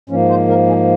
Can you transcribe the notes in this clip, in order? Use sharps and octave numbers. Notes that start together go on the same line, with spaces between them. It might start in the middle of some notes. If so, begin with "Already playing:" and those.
G#2 F3 A#3 C#4
C5
A#4
G#4